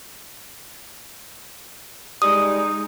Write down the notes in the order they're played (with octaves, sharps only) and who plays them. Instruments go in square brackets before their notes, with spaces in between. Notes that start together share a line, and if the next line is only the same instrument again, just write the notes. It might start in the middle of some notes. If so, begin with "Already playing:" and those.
[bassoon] G3 [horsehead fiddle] G#3 D#4 [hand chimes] D#6